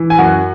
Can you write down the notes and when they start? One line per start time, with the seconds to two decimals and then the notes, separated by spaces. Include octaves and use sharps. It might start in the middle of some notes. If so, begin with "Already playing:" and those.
Already playing: E3
0.10 G#5
0.18 F#2 F#4 F#5